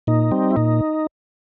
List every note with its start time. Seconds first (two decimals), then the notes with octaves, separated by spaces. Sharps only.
0.07 A#2 D#4
0.31 G3 C4
0.51 E4
0.56 A#2 D#4